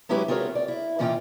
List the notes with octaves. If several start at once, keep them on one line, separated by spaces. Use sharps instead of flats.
F#3 G#3 C#4 E4 G4 B4
C4 F4 F#4 G#4 A#4 C#5
D5
E4
A#2 E3 C#4 F4 D#5 G5